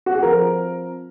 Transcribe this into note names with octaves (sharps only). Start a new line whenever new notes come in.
F#4
G#4
F3 C4 A#4